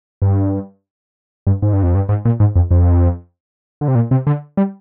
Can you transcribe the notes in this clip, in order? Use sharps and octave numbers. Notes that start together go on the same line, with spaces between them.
G2
G2
G#2
G2
F2
G2
G#2
A#2
G#2
F2
F2
D3
C3
A#2
C3
D3
G3